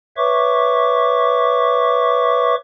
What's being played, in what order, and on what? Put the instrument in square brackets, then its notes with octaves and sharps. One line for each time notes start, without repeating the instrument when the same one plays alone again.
[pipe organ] B4 C#5 E5 C#6 D6